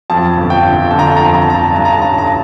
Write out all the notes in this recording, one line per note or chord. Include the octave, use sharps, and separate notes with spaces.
F2 A5
G1
G5
G1
D3 A5
A#5
A5
F2 A#5
A5
A#5
G1 A5
A#5
A5
A#5
G2 A5
A#5
A5
A1 A#5
A5
A#5
A5